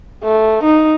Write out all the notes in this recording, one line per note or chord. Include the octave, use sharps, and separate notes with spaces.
A3
D#4